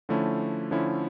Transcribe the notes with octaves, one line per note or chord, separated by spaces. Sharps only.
D3 F3 A3 C#4 E4
D3 F3 A3 C#4 E4